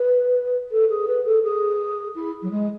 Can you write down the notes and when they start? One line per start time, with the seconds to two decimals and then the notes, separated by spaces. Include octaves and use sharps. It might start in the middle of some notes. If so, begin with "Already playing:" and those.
Already playing: B4
0.71 A4
0.89 G#4
1.07 B4
1.25 A4
1.43 G#4
2.15 E4
2.42 F#3
2.50 G#3